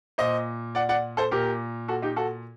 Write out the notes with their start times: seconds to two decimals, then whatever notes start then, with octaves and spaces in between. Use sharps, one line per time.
0.18 A#2 C5 D#5
0.75 D5 F#5
0.89 D5 F#5
1.17 A4 C5
1.31 A#2 G4 A#4
1.88 F#4 A4
2.02 D#4 G4
2.16 F#4 A4